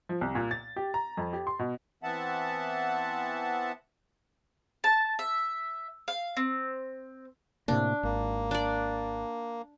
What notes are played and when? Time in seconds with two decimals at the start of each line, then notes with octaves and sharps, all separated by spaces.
0.09 F3
0.21 C2
0.35 A#2
0.51 A6
0.76 G4
0.94 A#5
1.17 F2
1.33 G4
1.47 C6
1.59 B2
2.03 E3 B3 C4 E5 F#5 A5
4.84 A5
5.19 E5
6.08 F5
6.37 C4
7.68 A2 C3 A#3 D4
8.03 G#1 A#3
8.51 D4 D5